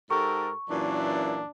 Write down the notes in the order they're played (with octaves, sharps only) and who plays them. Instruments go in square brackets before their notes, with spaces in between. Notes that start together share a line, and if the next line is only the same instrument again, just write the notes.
[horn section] G#2 G4 A4 [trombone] A#4 [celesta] C#6
[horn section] F#2 A#2 E3 [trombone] D4